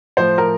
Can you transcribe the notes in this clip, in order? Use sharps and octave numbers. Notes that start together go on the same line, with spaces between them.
A2 F3 C5
A#4